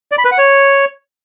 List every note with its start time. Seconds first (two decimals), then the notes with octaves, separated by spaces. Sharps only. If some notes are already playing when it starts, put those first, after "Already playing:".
0.12 D5
0.18 B5
0.25 B4
0.32 F#5
0.38 C#5